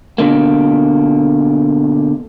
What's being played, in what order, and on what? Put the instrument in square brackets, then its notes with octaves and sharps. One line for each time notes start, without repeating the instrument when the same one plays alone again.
[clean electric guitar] B2 D3 A#3